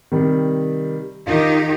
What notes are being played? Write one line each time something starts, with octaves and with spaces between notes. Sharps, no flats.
C3 D#3 G3
D#3 D#4 F4 G4